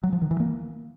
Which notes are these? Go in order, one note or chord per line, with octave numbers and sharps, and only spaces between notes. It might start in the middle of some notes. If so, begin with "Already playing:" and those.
F#3
F3
D#3
E3
A#3